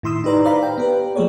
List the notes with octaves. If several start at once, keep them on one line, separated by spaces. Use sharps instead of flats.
A2 D#3 E4 C6 D#6 E6
D#4 G4 B4 D5 A#5
B4 C5 D5 F5 A#5 B5
G5
B3 G4 B4
F3 A3 A#3 G#4 C#5 D5